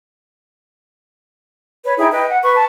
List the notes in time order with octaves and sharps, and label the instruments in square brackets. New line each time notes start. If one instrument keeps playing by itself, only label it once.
[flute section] B4 C#5
D#4 E4 G#4 G5
B4 D#5 G5
F#5
B4 C#6
A5